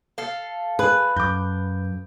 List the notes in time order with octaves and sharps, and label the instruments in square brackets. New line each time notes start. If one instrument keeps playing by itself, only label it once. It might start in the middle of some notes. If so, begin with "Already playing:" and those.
[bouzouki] A4 F5
[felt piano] G#4 [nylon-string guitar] B4
[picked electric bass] F#2 [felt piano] D6 G6